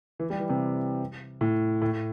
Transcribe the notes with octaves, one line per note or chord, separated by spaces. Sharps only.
E3
G3
E3
C3
A2
A2